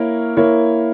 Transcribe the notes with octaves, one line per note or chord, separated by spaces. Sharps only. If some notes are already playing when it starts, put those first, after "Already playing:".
Already playing: A#3 E4 A#4 C#5
A#3 E4 A#4 C#5